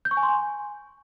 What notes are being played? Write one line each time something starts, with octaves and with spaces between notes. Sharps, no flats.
G6
C#6
G#5
C6
G#5